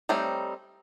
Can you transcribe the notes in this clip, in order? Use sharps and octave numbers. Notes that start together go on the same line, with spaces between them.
G3 A3 C4 D#4 C#5